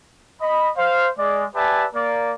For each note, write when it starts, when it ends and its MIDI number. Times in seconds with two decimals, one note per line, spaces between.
0.42 0.70 75
0.42 0.70 83
0.77 1.09 72
0.77 1.09 77
1.18 1.44 56
1.18 1.44 74
1.55 1.84 67
1.55 1.84 71
1.55 1.84 74
1.55 1.84 76
1.55 1.84 80
1.55 1.84 81
1.94 2.32 58
1.94 2.32 70
1.94 2.32 74